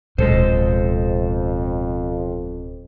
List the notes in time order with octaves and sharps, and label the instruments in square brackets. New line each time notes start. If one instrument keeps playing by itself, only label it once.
[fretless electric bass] D1 [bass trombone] F2 [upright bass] B2 [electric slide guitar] G#3 A4 C5